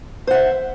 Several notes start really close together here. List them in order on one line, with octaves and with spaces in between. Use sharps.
C5 F#5 E5